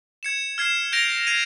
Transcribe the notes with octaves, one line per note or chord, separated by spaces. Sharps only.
G#6 C#7 E7
F6 G#6 C7 E7
G6 A#6 D7 F7
G#6 C7 D#7